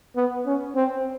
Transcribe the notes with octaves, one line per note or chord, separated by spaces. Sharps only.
B3
C#4
C4